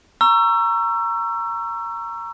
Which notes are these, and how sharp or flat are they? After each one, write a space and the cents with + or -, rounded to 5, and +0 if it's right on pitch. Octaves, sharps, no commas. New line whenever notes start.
A#5 +0 C#6 +0 E6 +30